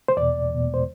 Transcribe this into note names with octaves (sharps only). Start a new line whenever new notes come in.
C5
E2 B2 D5
E2
B2
C5